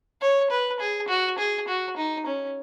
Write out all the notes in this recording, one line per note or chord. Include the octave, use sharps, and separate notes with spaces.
C#5
B4
G#4
F#4
G#4
F#4
D#4
C#4